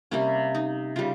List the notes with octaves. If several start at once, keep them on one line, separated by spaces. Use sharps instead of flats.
C3 G3 A#3 C#4
D#4
C#3 G3 F4